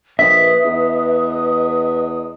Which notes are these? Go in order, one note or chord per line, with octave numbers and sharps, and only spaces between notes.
A#1 B4 D#5 E5 D#6 B6
E2